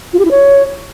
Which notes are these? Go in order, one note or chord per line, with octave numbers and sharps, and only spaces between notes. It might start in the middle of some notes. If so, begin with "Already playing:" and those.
F4
G4
E4
C#5